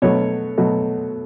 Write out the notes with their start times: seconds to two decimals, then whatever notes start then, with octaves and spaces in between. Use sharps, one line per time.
0.02 B2 F#3 A3 C#5
0.58 B2 F#3 A3